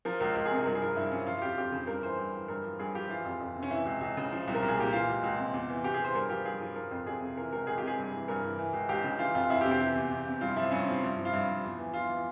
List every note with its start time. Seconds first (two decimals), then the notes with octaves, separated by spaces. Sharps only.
0.05 F3 A#4
0.20 C#2 A#4
0.35 C#2 A#4
0.46 G#4
0.51 C3 A#4
0.65 G2 A#4
0.75 G#4
0.81 F3 A#4
0.96 G2 E4
1.12 F3 C#4
1.27 F3 F4
1.37 F4
1.42 F2 G4
1.58 F2 G4
1.72 C#3
1.87 G2 A#4
2.03 E3 C5
2.19 G2
2.34 E3
2.48 G2 A#4
2.64 F3
2.79 G2 G#4
2.95 F3 G4
3.09 E3 F4
3.25 F2
3.40 F2
3.56 C3
3.63 C#4
3.71 E3 E4
3.86 C#2
4.01 C#2
4.17 C#3
4.32 F3
4.48 C2
4.55 A#4
4.63 C2
4.68 G#4
4.77 A#2 G4
4.92 E3 F4
5.08 C#2
5.24 C#2
5.38 C3
5.54 E2
5.70 E3
5.84 E2 G4
5.94 G#4
6.00 E3 C5
6.14 G2 A#4
6.29 F3 G4
6.45 G2 G#4
6.61 F3
6.76 F3 A#4
6.91 F2
7.06 F2 G#4
7.21 C3
7.37 E3 A#4
7.52 C#2 A#4
7.67 C#2 G#4
7.78 G4
7.82 C3
7.87 G#4
7.98 G2
8.13 E3
8.28 G2 A#4
8.44 E3
8.59 E3
8.73 C#2
8.89 C#2 G4
9.04 C#3
9.19 E3 F4
9.35 F2 F4
9.50 F2 E4
9.61 G4
9.66 C3
9.71 G4
9.81 E3
9.95 E2
10.11 E2
10.26 C3
10.41 G2 F4
10.56 F3 E4
10.72 G2 C#4
10.87 F3 C4
11.03 G2
11.17 F3
11.25 F4
11.33 G2 E4
11.48 F3
11.64 E2
11.78 E3
11.94 E2 F4
12.10 E3